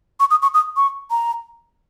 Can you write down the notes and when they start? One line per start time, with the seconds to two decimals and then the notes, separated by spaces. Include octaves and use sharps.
0.20 C#6
0.31 D#6
0.42 C#6
0.54 D#6
0.77 C#6
1.11 A#5